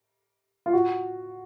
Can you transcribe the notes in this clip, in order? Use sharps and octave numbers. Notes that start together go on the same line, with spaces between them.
F4
F#4